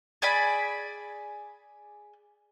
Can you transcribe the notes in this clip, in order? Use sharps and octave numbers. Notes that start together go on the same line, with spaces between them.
G#4 D5 G#5 B5